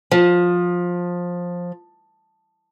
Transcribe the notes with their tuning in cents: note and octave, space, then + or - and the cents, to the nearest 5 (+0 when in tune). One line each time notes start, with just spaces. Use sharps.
F3 +15